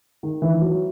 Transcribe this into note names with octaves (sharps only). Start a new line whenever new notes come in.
D#3
E3
F#3